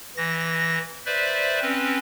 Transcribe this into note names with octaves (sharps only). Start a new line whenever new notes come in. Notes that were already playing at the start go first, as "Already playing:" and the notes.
E3 A#6
B4 C5 D5 E5
C4 C#4 B4